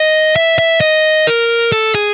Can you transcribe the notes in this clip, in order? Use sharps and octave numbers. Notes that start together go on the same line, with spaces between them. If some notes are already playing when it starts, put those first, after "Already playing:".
Already playing: D#5
E5
E5
D#5
A#4
A4
G#4